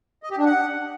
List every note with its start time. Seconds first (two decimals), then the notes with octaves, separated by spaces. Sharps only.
0.23 D#5
0.31 G4
0.38 D4
0.46 F#5